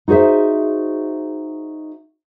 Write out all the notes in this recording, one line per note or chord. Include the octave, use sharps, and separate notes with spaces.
D#4 F#4 G#4 C5 E5